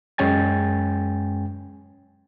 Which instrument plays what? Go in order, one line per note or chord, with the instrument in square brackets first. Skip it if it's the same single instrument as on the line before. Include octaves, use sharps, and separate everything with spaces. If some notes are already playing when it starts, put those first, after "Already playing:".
[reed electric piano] F#2 G#3 C#4 G5 G#5 A6